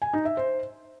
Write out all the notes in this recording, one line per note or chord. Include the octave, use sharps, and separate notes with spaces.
G#5
D#4
E5
C5